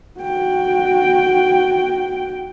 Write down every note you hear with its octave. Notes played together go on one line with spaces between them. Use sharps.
F#4 G5